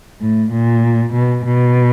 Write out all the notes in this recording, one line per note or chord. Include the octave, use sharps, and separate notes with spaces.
A2
A#2
B2
B2